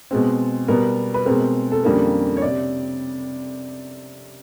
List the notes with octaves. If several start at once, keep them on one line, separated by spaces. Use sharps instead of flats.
B2 G#3 C4
B2 G3 B3 A#4
B4
B2 G#3 C4 A#4
A4
F2 D3 G3 A#3 C#4 A#4
C#5
C3 D5